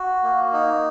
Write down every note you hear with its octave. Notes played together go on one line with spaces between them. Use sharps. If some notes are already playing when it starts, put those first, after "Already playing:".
Already playing: F#4
A#3
D#4